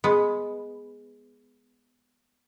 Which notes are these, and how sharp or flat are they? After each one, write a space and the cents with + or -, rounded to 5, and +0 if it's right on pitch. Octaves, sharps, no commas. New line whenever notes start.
G#3 +0 B3 +0